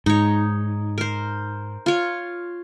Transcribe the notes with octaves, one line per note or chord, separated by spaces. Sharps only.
G#2 D#4 C#5
A#4 C5
F4 C#5